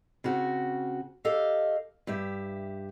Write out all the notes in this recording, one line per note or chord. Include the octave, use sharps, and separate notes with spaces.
C#3 C4 F#4
G4 A4 D#5 F5
G2 G4 E5